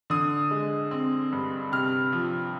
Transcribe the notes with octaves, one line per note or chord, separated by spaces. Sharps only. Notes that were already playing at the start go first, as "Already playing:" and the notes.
D3 D#6
G#3
C4
G2
C3 F6
F3